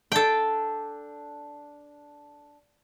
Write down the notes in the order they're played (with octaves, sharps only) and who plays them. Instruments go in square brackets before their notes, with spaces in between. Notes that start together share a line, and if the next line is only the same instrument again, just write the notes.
[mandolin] D4 [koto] A4 G5